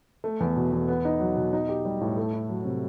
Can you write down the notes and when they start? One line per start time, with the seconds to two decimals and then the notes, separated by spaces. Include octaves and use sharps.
0.24 A3
0.40 E2
0.56 B2
0.72 E2
0.88 B3
1.05 D#4
1.20 F#3
1.36 B2
1.53 D#4
1.69 G4
1.85 G3
2.01 A2
2.17 A3
2.33 E4
2.50 F#3
2.65 C3